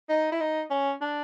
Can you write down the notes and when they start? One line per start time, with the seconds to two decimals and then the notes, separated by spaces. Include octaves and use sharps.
0.09 D#4
0.32 E4
0.40 D#4
0.70 C#4
1.01 D4